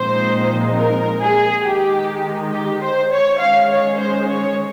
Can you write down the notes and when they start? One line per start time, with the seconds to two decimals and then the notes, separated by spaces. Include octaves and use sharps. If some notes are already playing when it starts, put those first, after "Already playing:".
Already playing: A#2 F3 G#3 C4 D#4 C5
0.76 A#4
1.21 G#4
1.64 D#3 G#3 D#4 G4
2.51 G4
2.81 C5
3.11 C#5
3.39 D#3 G#3 C#4 F5
3.69 C#5
3.98 C5
4.27 C#5